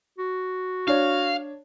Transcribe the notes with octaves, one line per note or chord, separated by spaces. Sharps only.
F#4
D4 C#5 F5